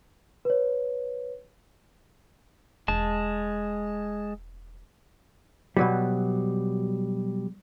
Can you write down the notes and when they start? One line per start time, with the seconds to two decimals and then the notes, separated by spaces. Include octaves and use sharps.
0.45 B4 C#5
2.88 E1 G#3 A5
5.77 B2 F#3 G3